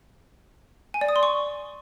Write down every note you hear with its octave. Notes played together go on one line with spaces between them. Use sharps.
G#5
D5
D#6
C6
C#6